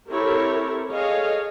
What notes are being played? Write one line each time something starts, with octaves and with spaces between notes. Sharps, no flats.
C4 E4 G4 A4 A#4 C#5
G#4 A4 C#5 D#5 F5